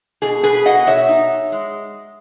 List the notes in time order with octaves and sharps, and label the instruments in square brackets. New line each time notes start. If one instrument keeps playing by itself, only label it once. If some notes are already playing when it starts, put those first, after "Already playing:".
[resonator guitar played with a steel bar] B2 G#4
G#4 B4
B2 D#5 F#5
C#5 E5
D#4
G#3